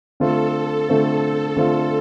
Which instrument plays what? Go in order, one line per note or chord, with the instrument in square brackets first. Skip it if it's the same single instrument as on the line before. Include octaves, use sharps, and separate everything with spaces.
[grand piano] D3 A3 C4 F4 [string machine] A4
[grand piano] D3 A3 C4 F4
[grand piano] D3 A3 C4 F4 [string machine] A4